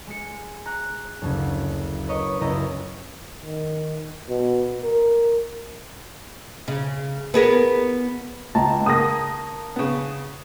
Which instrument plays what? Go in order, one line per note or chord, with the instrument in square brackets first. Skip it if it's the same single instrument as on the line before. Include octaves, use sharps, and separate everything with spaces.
[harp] G#3 C#7
A#5 F#6
F#1 D2 C#3
A#4 B4 C#5 D#5
F#1 C#2 E4 G4 D#5 A#5
[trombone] D#3
B2
A#4
[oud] C#3
B3 G#4 A#4
[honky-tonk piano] C#2 [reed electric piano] A5 A#5
[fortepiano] C#3 A#3 [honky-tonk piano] D#6 A#6
[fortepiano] C#3 B3